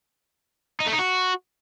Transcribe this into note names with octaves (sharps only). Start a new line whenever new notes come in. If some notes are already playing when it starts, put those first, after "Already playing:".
D#4
A3
D#4
F#4